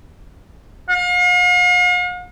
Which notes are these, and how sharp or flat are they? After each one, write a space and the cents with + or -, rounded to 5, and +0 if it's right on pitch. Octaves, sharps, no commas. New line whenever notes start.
F5 +45